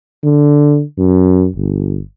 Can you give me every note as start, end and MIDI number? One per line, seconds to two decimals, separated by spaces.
0.23 0.83 50
0.98 1.47 42
1.56 2.00 31